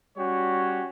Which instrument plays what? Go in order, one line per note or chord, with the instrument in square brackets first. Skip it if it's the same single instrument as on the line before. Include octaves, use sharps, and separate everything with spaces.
[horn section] G3 C#4 F#4 G4 C#5